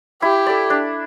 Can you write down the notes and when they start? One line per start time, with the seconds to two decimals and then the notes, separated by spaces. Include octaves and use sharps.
0.22 E4 G4
0.47 A4 D5
0.70 D4